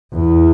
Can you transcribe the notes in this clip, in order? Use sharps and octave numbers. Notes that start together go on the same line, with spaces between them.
E2